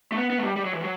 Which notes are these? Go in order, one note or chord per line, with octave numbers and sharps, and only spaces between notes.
A3
B3
B3
A3
G3
G3
F#3
E3
F#3